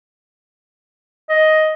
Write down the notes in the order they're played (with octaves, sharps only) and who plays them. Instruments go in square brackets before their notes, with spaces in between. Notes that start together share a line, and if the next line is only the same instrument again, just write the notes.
[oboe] D#5